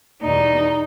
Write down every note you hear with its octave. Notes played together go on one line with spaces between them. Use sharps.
E2 B2 G3 D#4